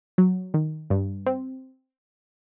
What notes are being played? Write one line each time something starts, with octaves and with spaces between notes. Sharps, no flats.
F#3
D#3
G2
C4